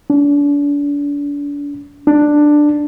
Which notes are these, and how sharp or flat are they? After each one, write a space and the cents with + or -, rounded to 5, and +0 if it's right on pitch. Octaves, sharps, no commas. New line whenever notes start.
D4 -35
D4 +10